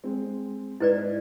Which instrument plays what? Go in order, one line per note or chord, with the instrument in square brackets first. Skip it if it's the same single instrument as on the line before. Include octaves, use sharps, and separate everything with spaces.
[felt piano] G#3 C4
[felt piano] G#2 [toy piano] E4 B4 D5